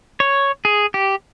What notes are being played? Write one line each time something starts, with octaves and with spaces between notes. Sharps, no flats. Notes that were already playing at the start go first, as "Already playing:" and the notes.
C#5
G#4
G4